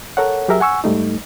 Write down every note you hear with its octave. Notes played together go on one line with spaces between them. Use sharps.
A4 A#4 C#5 F#5
F#3 G4 G#4 A#4 E5
F#5 G#5 C#6 E6
G#2 G3 A3 D#4